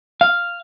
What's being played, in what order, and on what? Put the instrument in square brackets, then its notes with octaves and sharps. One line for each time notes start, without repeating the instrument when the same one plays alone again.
[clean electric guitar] F5